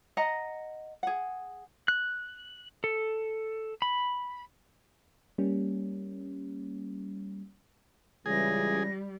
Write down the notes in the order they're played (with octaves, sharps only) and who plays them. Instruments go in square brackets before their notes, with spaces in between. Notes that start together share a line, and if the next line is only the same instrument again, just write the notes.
[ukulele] D#5 F#5 A#5
G#4 F#5
[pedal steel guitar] F#6
A4
B5
[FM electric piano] G3 A#3 C#4
[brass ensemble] C#2 C#3 E3 [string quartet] G3 [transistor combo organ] G#4 [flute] A#6